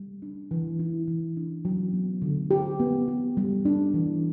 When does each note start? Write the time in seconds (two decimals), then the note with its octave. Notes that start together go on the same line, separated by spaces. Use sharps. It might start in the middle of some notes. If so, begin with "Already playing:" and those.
Already playing: G3
0.22 D4
0.51 E3
0.79 E4
1.07 E3
1.37 D4
1.65 F#3
1.93 B3
2.22 D3
2.51 G4
2.80 B3
3.08 G4
3.37 G3
3.65 D4
3.94 E3